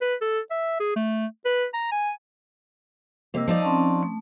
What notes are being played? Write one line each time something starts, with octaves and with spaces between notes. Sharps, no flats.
B4
A4
E5
G#4
A3
B4
A#5
G#5
C3 A#3 D#5 E6
F3 D#4 D5
C4 C#4 A5
A3